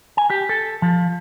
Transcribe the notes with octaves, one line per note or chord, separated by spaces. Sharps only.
G#5
G4
A4
F3